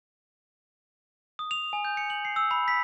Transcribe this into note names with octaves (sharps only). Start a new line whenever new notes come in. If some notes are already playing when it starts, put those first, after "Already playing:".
D#6
F7
G#5
G6
C#7
F#7
C7
E6
B5
B6